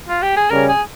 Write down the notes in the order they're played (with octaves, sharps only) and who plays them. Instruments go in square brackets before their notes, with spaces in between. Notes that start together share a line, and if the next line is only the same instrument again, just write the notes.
[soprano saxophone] F4
G4
G#4
[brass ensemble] C#3 G3 C#4 [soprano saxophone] A#4
[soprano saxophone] G#4